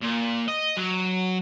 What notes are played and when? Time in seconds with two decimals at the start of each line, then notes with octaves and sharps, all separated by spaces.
0.01 A#2
0.48 D#5
0.77 F#3